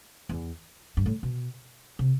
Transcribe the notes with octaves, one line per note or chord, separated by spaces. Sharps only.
E2
G2
A2
B2
C3